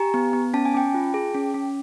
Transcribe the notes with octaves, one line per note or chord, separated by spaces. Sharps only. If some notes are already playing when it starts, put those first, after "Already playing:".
Already playing: G4 G#5 A#5
B3
B3
C#4 A5
G#5
C#4 G5 A5
F4
G#4
C#4
C#4